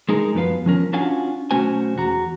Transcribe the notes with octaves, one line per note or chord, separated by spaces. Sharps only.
G#3 D#4 G#4 A#4
F#2 F3 B3 B4 F5
F3 C#4 A#4
C#4 D4 F4 F#4 F5 G#5
B1 A3 C#4 F#4 C5 G#5
E2 F#4 A#5